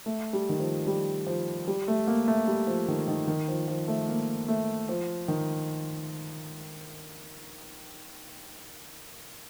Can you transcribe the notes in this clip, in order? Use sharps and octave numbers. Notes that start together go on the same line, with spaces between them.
A3
G3
D#3
F3
G3
F3
G3
A3
A#3
A3
G3
F3
D#3
D#3
D#3
F3
F3
A3
A#3
A3
F3
D#3